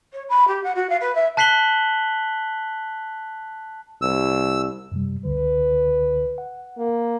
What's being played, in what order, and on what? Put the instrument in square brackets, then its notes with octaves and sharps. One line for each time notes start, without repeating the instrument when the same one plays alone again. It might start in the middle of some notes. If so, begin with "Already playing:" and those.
[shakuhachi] C#5
B5
G4
F#5
F#4
F5
B4
E5
[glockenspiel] A5 F#6 B6 C7 F#7 G7
[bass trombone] C2 [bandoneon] E6
[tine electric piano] F#2 C3 G3
[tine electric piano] C#2 D3 [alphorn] B4
[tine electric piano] F#5
[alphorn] A#3